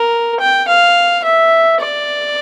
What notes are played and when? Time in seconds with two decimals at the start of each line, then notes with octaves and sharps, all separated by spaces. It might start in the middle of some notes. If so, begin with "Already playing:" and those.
Already playing: A#4
0.40 G5
0.68 F5
1.24 E5
1.81 D5